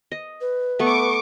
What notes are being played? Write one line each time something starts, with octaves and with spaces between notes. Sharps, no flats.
D#5
B4
A3 B3 C#6 D6